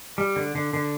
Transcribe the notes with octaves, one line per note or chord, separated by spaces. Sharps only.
G3
D3
D3
D3